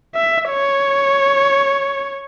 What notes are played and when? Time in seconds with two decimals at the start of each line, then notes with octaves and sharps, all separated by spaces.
0.15 E5
0.50 C#5